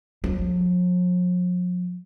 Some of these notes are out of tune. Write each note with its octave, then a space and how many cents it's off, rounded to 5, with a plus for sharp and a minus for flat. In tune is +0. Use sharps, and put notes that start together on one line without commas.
F3 +45